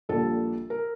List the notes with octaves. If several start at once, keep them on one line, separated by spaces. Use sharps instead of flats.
A#1 A#2 G3 A4
A#4